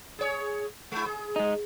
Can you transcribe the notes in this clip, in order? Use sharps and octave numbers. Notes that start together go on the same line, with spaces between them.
G#4 C#5
G#3 E4
G#4
G#3 D#4